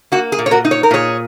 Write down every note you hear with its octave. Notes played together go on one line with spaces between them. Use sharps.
A#3 F#4
G#4
A#2
C#5
F#4 A#4
D#4
C#5
A#4
A#2 G#4 C#5